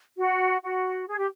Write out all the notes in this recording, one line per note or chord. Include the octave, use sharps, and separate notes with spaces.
F#4
F#4
G#4
G4